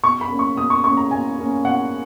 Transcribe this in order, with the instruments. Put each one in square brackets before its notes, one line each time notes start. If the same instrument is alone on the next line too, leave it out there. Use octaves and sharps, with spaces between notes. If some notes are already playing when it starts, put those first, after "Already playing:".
[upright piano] B2 C#6
B5
A#3 C#4
C#6
B2 D#6
C#6
A#3 C#4 C#6
A#5
B2 G#5
A#3 C#4
B2 F#5